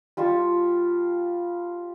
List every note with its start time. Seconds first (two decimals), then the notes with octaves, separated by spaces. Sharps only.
0.17 G3 F4 A5 C#6